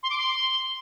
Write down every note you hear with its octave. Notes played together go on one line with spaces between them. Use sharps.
C6
D6
C6